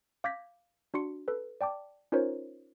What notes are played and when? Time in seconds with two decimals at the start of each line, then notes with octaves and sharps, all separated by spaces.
0.24 F5 D6 G6 G#6 A#6 B6
0.94 D4 F#4 C6 C#7
1.28 A4 B4
1.61 D5 G5 A5 D6
2.12 C#4 D#4 F4 A#4 C5 C#5